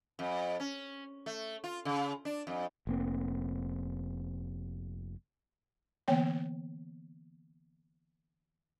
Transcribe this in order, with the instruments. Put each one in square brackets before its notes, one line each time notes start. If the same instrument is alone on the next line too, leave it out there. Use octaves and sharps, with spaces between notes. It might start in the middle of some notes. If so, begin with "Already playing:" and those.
[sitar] F2
C#4
A3
F4
C#3
D4
F2
[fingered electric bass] F1 A#3 C4
[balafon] D3 E3 A#3 B3 C#5 G5